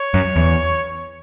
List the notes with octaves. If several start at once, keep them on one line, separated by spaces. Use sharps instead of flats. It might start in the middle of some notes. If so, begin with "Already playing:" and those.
Already playing: C#5
F#2
E2